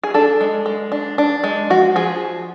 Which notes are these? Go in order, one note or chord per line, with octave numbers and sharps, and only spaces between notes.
G#4
D4 A4
G#3
G#3
D4
D4
G#3
F3 F#4
F3 G#4